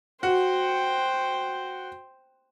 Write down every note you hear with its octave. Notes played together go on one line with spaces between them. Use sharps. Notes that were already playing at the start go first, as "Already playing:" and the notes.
F#4 C5 G5